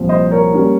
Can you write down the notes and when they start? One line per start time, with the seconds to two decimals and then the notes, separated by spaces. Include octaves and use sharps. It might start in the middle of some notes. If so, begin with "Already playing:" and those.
Already playing: C2 A#2 F3 C4
0.09 C5 D#5
0.31 A#4 C#5
0.54 G3 A#3 C#4